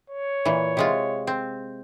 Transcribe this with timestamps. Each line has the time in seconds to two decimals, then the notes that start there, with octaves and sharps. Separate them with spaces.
0.10 C#5
0.45 A#2 E3
0.77 C3 G#3 F4
1.27 C4